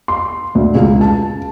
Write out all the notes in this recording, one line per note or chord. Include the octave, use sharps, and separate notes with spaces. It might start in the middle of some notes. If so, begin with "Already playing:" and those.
C6
D2
C#2
A5